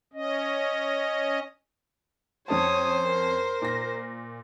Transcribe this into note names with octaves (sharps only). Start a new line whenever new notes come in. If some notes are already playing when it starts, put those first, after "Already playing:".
C#4 D#5
F2 C#4 C5 C#5 A5 D#6
A#4
A#2 A#6